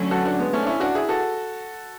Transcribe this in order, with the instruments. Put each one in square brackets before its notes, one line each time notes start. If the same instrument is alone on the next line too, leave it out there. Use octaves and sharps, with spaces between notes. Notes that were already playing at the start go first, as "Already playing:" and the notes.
Already playing: [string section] D3 F#3 A3 C#4
[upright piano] F#4 A4
D4 F#4
G#3 B3
A3 C#4
D4
C#4 E4
D4 F#4
E4 G#4
F#4 A4